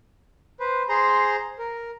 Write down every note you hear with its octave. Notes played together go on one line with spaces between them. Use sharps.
B4 C5
G#4 C5 A#5 C6
A#4